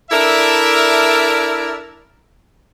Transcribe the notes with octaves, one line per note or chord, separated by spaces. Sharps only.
D4 E4 A4 A#4 D5 E5